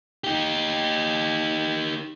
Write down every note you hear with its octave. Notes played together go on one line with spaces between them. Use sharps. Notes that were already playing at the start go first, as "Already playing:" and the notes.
D#4 G4